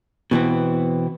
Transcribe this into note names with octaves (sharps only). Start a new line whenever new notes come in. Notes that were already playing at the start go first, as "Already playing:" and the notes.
B2 E3 B3 C4